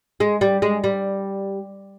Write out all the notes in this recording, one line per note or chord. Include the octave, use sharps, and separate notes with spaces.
G#3
G3
G#3
G3